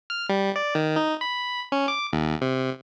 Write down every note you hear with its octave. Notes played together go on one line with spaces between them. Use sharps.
F6
G3
D5
D#3
D#4
B5
C#4
D6
D#2
C3